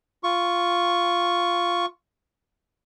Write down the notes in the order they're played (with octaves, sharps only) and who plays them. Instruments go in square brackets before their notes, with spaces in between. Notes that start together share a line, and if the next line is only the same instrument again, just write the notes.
[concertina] F4 C#6